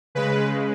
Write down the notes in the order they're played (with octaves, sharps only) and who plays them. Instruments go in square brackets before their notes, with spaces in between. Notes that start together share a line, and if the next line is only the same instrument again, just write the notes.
[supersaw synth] C#3 G#3 B4